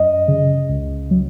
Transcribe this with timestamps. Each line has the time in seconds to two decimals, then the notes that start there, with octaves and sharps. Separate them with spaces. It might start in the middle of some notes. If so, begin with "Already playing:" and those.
Already playing: F#2 D#5
0.28 C#3
0.69 C#2
1.11 F#3